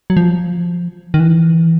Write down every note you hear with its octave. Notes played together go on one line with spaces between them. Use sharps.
F#3
F3
D#3
E3